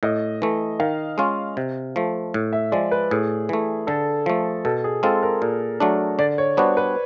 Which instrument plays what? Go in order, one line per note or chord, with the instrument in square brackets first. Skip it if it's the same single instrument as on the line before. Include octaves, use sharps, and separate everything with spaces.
[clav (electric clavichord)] A2 [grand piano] D#5
[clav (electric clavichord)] E3 A3
[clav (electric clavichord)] D#3 [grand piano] F5
[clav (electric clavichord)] G#3 C#4 F4
C3
F3 A3
A2
[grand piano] E5
[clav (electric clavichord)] F3 G#3 [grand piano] D5
[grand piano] B4
[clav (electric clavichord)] A2 [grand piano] G#4
[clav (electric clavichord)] E3 A3
[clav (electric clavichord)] D3 [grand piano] A4
[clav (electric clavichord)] F3 A3
[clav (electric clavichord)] B2 [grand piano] A4
[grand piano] G#4
[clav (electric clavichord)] G#3 C4 F4 [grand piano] A4
[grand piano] A#4
[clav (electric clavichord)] A#2 [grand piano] G#4
[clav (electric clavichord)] F#3 A3 D4
[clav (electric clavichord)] D3 [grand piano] D5
[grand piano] C#5
[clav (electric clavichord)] G3 B3 D4 F#4 [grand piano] C5
[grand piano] B4